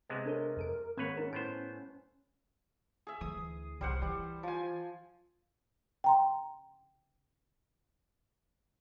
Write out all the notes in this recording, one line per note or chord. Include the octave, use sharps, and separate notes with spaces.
C3 G#3 B3
D4 A4 A#4 C#5
F2 A4 D7
G#1 A#3 C4 A#4 B4 C#5 G#6
C#4 D#4 A#4
A2 B3 C5 D7
G#4 E5
D2 E3 D#6
C2 G3 C5 F#5
E3 G3
F3 G#5
G5 A#5 C6